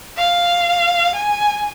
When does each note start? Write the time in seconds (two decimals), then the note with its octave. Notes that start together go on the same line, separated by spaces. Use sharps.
0.17 F5
1.15 G#5